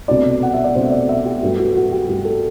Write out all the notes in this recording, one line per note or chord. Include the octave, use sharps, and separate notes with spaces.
C2 B2 A3 D4 D5
F#5
E5
D5
C2 B2 A3 D4 C5
D5
E5
G4
G2 F#3 A3 F#4
F#4
F#4
G4
G2 F#3 A3 F#4
A4